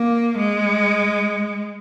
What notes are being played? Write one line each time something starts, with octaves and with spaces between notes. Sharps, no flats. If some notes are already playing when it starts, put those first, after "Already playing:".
Already playing: A#3
G#3